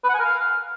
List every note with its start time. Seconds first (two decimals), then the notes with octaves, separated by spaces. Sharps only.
0.04 B4
0.09 F#5
0.14 G#5
0.19 A#4
0.25 F5